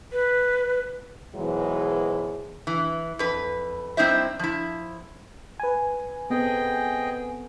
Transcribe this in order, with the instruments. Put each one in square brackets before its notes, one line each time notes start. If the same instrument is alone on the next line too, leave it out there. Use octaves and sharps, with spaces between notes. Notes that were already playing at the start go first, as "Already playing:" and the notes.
[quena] B4
[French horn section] G#2 B2 E3 F#3 G#3
[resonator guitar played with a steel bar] E3
F2 B4
G3 C4 D#4 E4 C5 E5
F3 E4
[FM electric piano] B4 G#5
[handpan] B3 C4 A4 [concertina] G#4 D#5 G5